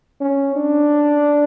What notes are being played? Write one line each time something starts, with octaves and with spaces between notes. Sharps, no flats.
C#4
D4